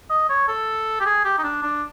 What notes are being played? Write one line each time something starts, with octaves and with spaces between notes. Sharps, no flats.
D#5
C#5
A4
G4
G#4
G4
D#4
D4
D4